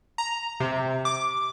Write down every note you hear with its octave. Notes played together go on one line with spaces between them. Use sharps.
A#5
C3
D6